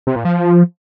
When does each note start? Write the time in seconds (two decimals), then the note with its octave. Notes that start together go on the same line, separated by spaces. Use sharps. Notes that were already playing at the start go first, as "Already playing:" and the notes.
0.07 C3
0.16 A#2
0.25 F3